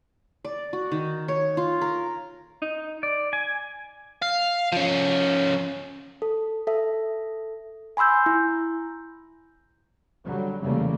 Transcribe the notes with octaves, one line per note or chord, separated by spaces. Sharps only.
D5
F#4
D#3
C#5
F4
A#4
D#4
D5
G#5
F5
F3 C#4
A4
A4 E5
G#5 B5 C6 E6 G6
E4
D3 F#3 G3
F1 E2 C#3 G3 A3 A#3